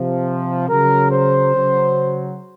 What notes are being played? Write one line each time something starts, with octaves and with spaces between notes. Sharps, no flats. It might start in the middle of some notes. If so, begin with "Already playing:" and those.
Already playing: C3 F3
C#3 F#3 A#4
C5
C#3 F#3